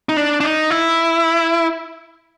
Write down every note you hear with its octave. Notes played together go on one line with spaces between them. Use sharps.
D#4
D4
D4
D#4
E4